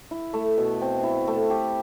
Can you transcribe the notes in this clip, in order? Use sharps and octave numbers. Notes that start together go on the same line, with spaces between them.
E4
A3
B2
C4
E4
A3
G4